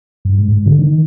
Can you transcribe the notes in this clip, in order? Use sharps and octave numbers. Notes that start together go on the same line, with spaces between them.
G2
G#2
G#2
D3
D#3